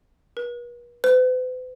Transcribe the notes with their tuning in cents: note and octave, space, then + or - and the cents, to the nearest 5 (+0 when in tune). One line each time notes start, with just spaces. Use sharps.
B4 -45
B4 +45